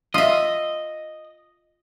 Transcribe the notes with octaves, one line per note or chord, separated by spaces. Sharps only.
F4 D#5 E5